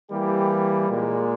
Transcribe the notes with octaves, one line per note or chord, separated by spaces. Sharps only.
E3 G3 A#3 G4
A#2 G#3